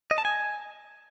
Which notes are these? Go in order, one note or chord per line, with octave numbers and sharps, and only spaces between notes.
D#5
A5
G#5